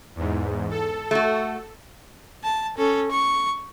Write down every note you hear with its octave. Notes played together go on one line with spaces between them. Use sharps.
E2 G#2
A4
A3 F#4
A5
C#4 A4
C#6